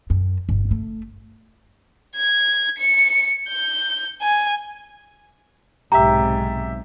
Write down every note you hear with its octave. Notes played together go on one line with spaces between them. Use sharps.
F#2
G1
A3
G#6
C#7
G6
G#5
B1 G#2 C3 G4 E5 A#5